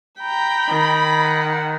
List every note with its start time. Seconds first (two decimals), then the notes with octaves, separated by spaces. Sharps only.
0.20 G5 A#5 B5
0.69 D#3
1.23 F#5